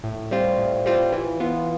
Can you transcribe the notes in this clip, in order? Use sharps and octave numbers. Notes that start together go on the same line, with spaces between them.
A2
G3 C4 F4
A2
G3 C4 F4
E3
B3 F4